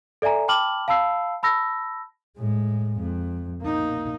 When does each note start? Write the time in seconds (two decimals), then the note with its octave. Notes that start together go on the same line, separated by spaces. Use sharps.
0.22 A4 D5 E5 G#5 A#5
0.48 G5 A5 B5 D6 F6 F#7
0.88 F5 A5 B5 E6 C7
1.43 A5 B5 E6 A#6
2.37 A2 G#3
3.00 F2
3.61 A#3 D#4